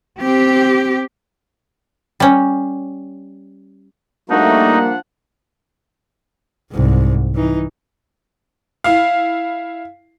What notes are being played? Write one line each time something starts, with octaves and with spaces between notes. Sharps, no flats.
C4 G4
G3 C#4
F3 G3 A3 A#3 D4 D#4 F#4 F#5
C2 G#2
E3 D#4
E4 F5